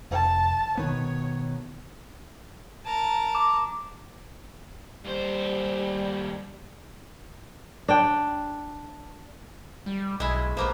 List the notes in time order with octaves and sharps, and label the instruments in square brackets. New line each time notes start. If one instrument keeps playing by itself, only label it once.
[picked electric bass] F1 [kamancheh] A5
[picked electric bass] B2 D#3 B3 [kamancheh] C#5
[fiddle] A#4 A5
[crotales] D6
[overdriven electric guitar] D#2 C5 [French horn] G3
[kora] D4 G5
[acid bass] G3
[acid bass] B1 [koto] G#3 E4
[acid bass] A#1 [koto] F3 A#3 B3